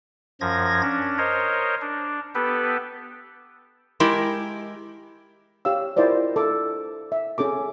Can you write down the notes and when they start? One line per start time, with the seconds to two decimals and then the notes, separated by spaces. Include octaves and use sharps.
0.41 F#2 F3 G#6 A#6
0.82 C#4 D4
1.18 A#4 C5 C#5 D#5
1.81 D4
2.35 B3 G4 A4 B4
4.00 G#3 E4 G4 A#4
5.65 G4 C#5 F5 E6
5.96 E4 F4 A#4 C5 D5 D#5
6.36 A4 D6
7.12 E5
7.38 C#4 G#4 A4 D6